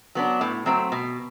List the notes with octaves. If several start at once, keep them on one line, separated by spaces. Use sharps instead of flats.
F#3 B3 D4
A2
F#3 A3 C4
B2